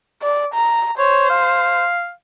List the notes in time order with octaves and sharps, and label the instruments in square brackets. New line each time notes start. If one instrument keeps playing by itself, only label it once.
[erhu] D5
A#5
[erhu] C5 [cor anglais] C#5
[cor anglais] F5